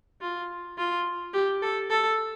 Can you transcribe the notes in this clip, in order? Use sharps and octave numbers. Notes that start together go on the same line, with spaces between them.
F4
F4
G4
A4
A4